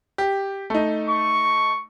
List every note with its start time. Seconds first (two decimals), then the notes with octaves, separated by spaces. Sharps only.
0.18 G4
0.70 A3 D#4
1.10 C#6